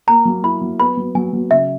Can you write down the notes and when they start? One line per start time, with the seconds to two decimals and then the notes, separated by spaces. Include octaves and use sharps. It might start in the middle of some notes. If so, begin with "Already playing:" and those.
0.07 A#3 A#5
0.25 F#3
0.44 E4 B5
0.61 F#3
0.79 B3 B5
0.97 F#3
1.15 F#3 G#5
1.33 F#3
1.51 C#3 E5